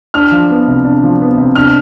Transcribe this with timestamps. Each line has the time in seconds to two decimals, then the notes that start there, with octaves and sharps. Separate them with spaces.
0.14 D4 F6
0.31 F3
0.50 B3
0.68 C3
0.84 D4
1.03 F3
1.21 B3
1.38 C3
1.55 D4 F6